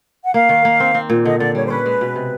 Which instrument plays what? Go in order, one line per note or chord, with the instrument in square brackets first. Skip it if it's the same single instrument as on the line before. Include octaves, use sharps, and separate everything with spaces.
[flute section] F#5
[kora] A#3 [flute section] F5
[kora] D#3
A#3
C4
C4
A#2
[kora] D3 [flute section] D#5
[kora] D3 [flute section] D5
[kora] G3 [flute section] C#5
[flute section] C5
[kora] C#4 [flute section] B4
[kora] G#3
B2
C3